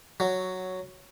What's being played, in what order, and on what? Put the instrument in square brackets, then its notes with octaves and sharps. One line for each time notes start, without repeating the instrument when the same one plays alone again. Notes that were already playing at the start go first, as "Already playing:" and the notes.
[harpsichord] F#3